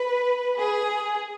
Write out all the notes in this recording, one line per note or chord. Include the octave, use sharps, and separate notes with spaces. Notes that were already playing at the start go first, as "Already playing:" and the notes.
Already playing: B4
G#4